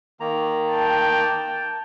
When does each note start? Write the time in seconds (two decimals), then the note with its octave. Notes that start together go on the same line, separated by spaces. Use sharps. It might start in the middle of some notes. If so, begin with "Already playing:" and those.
0.20 D#3 A#3 A#5
0.71 G5 A5